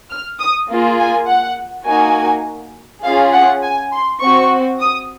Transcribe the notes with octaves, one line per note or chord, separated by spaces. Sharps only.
F6
D#6
A#3 F4 G#4
G#5
F#5
A#3 D#4 F#4 G#5
C#4 F4 G#4 F5
F#5
G#5
C6
C4 F#4 C#6
D#6